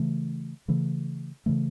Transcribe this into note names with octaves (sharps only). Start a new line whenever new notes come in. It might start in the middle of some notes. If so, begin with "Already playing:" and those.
Already playing: C#3 E3 A3
C#3 E3 A3
C#3 E3 A3